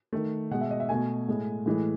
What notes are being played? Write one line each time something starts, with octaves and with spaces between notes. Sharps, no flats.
D#3 A3
B2 G#3 F#5
E5
D#5
E5
B2 A3 G#5
A2 G#3
A2 E3 G#3